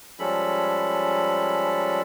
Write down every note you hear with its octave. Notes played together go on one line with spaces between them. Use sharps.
F3 G3 G#3 C#4 A4 B5